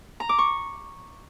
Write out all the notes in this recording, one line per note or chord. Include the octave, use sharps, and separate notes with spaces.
A#5
D6
C#6